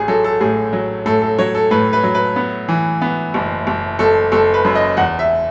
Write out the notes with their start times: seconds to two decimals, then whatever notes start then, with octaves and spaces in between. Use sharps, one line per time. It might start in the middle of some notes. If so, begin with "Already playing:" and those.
Already playing: A1 G#4
0.08 F#3 A4
0.24 A4
0.41 A2 G#4
0.73 F#3
1.06 A2 A4
1.22 A4
1.39 F#3 C#5
1.55 A4
1.71 A2 B4
1.93 B4
2.04 F#3
2.15 B4
2.36 B3
2.69 E3
3.02 B3
3.34 F#1
3.67 F#1
3.99 F#1 A4
4.32 F#1 A4
4.54 B4
4.65 F#2
4.75 D#5
4.97 E2 F#5
5.19 E5